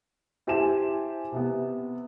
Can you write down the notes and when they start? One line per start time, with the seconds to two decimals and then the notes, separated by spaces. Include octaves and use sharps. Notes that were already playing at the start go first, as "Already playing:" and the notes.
0.47 E4 G4 C5 G#5 A5 E7
1.32 C3 B3